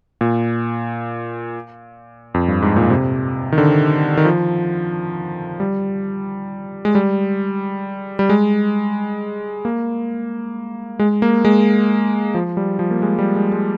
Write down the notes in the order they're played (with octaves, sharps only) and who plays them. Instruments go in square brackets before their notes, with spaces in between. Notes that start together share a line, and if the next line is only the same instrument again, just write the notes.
[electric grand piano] A#2
F2
G2
G#2
A#2
C3
D#3
D3
D#3
F3
G3
G#3
G3
G3
G#3
A#3
G#3
A#3
G#3
F3
G3
F3
A#3
G#3
G3
G#3
G#3